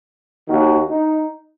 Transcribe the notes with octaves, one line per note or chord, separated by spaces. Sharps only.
D#2 D#3 F#4
D#4